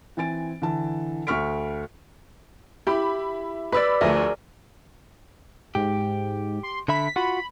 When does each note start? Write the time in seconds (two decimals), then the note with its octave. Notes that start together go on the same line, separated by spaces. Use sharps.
0.17 E3 C4 G#5 A6 D7
0.62 D3 E3 A5
1.27 D2 A4 C#6 F6 B6 D7
2.87 E4 G4 B5
3.72 B4 D5 B5 E6
4.01 D2 F3 A3 G#4 A#4
5.75 G#2 G4
6.63 C6
6.88 D3 E5 B5 B6
7.16 F4 F#4 F#5 B5